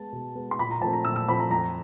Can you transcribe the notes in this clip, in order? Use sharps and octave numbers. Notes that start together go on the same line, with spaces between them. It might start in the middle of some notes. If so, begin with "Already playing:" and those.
Already playing: G#3 B3 A5
B2
G#3 B3
C6
A#2 B5
A#5
F3 A3 C4 A5
A#5
A#2 E6
E6
F3 A3 C4 B5
A#5
F2 A#5